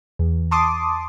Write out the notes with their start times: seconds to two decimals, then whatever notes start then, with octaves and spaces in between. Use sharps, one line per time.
0.19 E2
0.51 A5 C6 D6 D#6